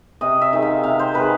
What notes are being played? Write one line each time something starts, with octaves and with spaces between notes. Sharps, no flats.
C3 D#5
E5
D#3 G#3
F5
C3 F5
C5
D#3 G#3 B4